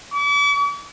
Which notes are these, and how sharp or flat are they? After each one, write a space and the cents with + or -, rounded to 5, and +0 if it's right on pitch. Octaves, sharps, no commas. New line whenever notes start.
D6 -45